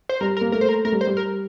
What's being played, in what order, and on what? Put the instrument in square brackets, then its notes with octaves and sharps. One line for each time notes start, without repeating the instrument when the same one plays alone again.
[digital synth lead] C5
[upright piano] G3 [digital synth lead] A#4
[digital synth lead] A#4
[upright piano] A#3
[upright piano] A3 [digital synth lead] A#4
[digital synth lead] C5
A#4
[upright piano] A3 [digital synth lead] A#4
[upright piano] G3
[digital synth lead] C5
[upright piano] G3
[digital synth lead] A#4